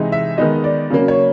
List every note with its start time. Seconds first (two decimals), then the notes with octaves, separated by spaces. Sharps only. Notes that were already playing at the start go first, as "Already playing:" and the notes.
Already playing: C3 E3 G#3 C4 D#4
0.12 E5
0.38 D#3 G#3 B3 D#4 D#5
0.64 D5
0.90 C#3 F#3 A#3
1.08 C#5